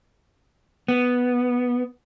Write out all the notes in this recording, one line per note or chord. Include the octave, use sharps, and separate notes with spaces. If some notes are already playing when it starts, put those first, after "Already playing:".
B3